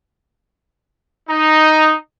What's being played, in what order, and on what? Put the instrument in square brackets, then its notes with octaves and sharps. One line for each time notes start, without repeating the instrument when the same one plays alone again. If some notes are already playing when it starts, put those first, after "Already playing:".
[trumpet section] D#4